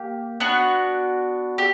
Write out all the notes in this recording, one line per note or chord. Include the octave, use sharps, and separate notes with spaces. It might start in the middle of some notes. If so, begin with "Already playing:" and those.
Already playing: A#3 G4
B3 D4 F#4
G4